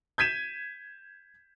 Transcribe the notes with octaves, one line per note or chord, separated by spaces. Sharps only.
G6 G#6 B6 D#7 E7